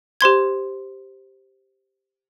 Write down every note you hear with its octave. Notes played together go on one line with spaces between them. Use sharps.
G4 C5 C6 G#6